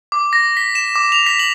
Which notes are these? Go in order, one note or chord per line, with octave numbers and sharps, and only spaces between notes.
D6
A#6
B6
E7
D6
F7
B6
F#7